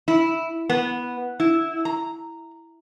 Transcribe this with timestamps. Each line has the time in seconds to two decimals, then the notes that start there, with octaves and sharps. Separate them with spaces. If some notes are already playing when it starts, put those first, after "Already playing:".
0.08 E4
0.70 B3
1.40 E4
1.85 A#5